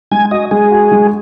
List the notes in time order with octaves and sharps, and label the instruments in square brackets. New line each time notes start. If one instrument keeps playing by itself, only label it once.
[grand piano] G#3 [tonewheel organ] G#5
[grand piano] F#4 [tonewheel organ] D#5
[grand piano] G#3 [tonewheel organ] G#4
[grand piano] F#4
G#3